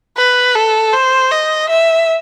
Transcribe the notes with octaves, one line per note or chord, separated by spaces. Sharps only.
B4
A4
C5
D#5
E5